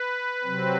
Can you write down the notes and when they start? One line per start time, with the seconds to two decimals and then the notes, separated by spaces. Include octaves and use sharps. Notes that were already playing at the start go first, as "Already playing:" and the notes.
Already playing: B4
0.43 C3 F#3 C4